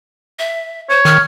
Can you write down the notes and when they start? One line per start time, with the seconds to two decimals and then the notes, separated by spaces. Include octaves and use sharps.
0.39 E5
0.90 C5 C#5
1.05 D#3 F6